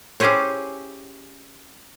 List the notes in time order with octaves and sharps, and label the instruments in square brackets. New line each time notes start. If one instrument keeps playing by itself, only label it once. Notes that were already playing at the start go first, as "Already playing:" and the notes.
[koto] C#4 E4 G4 G#4 C5 C#5